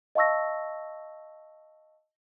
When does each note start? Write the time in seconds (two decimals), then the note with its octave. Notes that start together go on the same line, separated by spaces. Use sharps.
0.15 D#5 F5 A5 C#6 E6 A#6